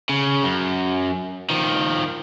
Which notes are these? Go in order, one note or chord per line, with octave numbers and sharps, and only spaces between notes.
C#3
F#2
D#3 F3